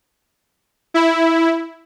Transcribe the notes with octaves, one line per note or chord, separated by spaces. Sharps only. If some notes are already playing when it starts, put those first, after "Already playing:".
E4